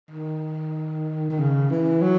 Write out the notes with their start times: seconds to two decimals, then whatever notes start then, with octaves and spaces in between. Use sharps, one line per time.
0.11 D#3
1.30 D#3
1.39 C#3
1.70 E3
2.02 F#3